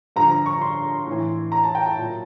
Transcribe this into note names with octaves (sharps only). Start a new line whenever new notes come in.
G2 D3 F3 A#5
A#5
C#6
C6
A2
E3
A#5
A5
G5
A5
A#2 F#3